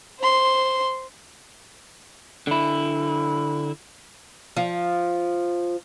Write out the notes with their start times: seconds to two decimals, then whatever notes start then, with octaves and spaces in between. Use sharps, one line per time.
0.19 C5 C6
2.47 D3 E4
4.57 F3